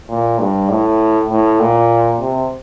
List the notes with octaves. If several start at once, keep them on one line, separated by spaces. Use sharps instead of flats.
A#2
G2
A2
A2
A#2
C3